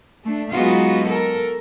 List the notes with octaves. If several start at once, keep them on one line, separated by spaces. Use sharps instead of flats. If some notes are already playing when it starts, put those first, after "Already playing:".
A3 D4
F#3 G#3 B3 D#4 F4 F#4
A4 A#4